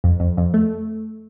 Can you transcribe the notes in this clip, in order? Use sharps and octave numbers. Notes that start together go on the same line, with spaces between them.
F2
F2
F2
A3